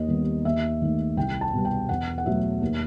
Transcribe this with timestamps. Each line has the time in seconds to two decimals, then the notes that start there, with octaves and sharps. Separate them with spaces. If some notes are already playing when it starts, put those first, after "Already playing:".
Already playing: D#2 D#5
0.08 D#3 G3 B3
0.45 D#2 E5
0.82 D#3 A3
1.17 C2 G5
1.41 A5
1.53 B2 G3
1.65 G5
1.89 E2 F#5
2.18 F#5
2.25 B2 F#3 A3 E5
2.62 D#2